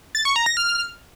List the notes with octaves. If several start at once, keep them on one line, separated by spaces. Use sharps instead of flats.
A6
C#6
A#5
A#6
F6